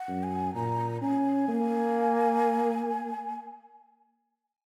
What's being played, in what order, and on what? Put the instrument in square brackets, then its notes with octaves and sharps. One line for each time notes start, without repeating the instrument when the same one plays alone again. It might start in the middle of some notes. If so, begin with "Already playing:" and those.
Already playing: [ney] F#5
[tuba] F#2
[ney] G#5
[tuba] A#2 [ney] A#5
[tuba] C#4 [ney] G#5
[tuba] A#3